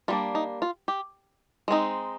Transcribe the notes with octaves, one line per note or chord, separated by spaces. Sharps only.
G3 A#3 D4 F4
D#4
F4
G4
G#3 C4 D#4